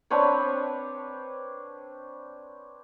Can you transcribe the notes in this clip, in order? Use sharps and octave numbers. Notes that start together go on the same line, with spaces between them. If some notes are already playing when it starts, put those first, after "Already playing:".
C4 D4 B4 C#5